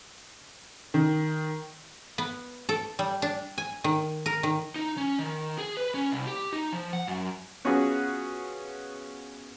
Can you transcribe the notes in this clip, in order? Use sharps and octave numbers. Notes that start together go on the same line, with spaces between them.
D#3
B3
A4
G3
D4
G#5
D#3
A#4
D#3
D#4
C#4
D#3
G#4
B4
C#4
C2
G4
D#4
F3
F#5
F#2
B3 C#4 F4 F#4 G#4 B4